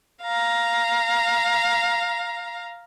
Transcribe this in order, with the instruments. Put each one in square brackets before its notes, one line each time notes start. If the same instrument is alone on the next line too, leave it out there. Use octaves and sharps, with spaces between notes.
[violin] F5 A#5